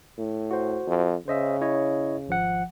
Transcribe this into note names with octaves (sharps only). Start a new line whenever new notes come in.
A2
F#4 C5
F2
C#3 C5 D#5 E5
E4 C#5 D#5
G#1 F3 F#5